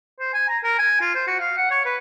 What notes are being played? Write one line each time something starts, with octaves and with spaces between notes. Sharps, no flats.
C5
G#5
A#5
A#4
G#5
F4
C5
F#4
F5
F#5
C#5
B4